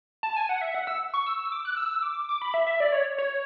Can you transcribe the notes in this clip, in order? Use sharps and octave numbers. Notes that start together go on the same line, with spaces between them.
A5
G#5
F#5
E5
F#5
E6
C#6
E6
E6
D6
F#6
E6
D6
D6
B5
E5
E5
D5
C#5
C#5